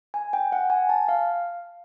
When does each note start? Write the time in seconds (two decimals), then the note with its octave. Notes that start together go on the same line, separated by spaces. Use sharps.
0.14 G#5
0.33 G5
0.52 F#5
0.70 G#5
0.89 A5
1.08 F5